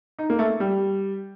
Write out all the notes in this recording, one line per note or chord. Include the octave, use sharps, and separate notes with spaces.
D#4
A#3
A3
G3